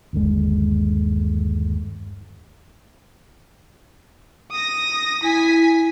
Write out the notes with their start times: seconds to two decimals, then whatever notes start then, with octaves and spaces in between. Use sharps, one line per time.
0.13 G1 D#2 D3 G#3
4.51 D#6 A#6
5.23 E4 G#5 B6